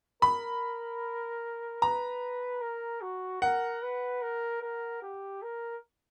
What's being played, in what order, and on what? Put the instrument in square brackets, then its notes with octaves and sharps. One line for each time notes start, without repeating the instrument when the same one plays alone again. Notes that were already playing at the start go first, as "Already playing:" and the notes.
[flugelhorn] A#4 [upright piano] B5
[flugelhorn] B4 [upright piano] A#5
[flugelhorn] A#4
F#4
[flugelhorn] A#4 [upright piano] F#5
[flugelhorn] B4
A#4
A#4
G4
A#4